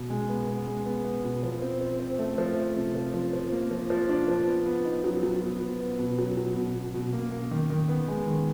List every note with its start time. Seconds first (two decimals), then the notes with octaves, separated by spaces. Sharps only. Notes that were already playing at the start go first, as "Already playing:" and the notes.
Already playing: B2
0.10 G#3
0.29 B3
0.48 B3
0.67 G#3
0.86 B3
1.05 B3
1.24 B2
1.43 F3
1.62 C4
1.81 C4
2.00 C4
2.19 A3
2.38 F3
2.57 A3
2.76 C3
2.95 F3
3.14 F3
3.33 F3
3.52 A#3
3.71 F3
3.90 F3
4.09 D4
4.28 F3
4.47 B3
4.66 B3
4.85 D#4
5.04 F#3
5.23 F#3
5.42 B3
5.61 B3
5.80 B3
5.99 B2
6.19 F#3
6.37 F#3
6.56 B2
6.75 B2
6.94 B2
7.13 A#3
7.32 A#3
7.51 D#3
7.70 D#3
7.89 B3
8.08 G#3
8.27 D#3